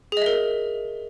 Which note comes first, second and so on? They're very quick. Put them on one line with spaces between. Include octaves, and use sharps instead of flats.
G#4 D#5 E5 A#4